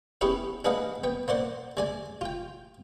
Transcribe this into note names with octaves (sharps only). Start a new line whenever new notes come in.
B3 C#4 E4 G4 G#4 B4
D4 G#4 B4 D#5 F5 F#5
B3 G5
A#3 C5 D5 F#5
G#3 D5 G#5
F4 G5